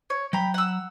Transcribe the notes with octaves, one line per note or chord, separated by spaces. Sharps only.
C#5
F#3 G5 A#5 B5
F#5 E6